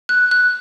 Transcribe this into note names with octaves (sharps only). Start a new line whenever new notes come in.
F#6
F#6